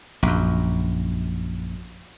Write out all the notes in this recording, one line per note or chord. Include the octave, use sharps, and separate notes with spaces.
A#1 F#2